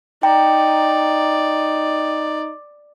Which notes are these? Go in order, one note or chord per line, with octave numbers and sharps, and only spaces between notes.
D#4 D5 G5 A#5